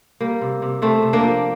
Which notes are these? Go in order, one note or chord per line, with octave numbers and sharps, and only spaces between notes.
G3 A#3
C3
C3
C3 A3 C4
C3
A#3 D4
F3